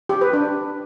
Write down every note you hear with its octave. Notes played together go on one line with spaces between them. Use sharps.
G4
B4
D4